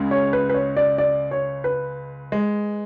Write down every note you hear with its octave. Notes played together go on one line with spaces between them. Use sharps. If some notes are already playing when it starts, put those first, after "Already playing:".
Already playing: C#2 C#3 G#3
C#5
B4
B4
C#5
D5
D5
C#5
B4
G#3